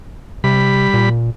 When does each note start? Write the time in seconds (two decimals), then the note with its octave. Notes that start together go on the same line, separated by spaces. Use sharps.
0.44 C3 G3 B5
0.94 A#2